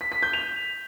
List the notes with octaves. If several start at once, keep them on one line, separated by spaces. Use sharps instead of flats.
B6
B6
G6
F7